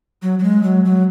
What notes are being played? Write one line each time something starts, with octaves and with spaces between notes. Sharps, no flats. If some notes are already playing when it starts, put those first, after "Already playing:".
F#3
F#3
G#3
F#3
F#3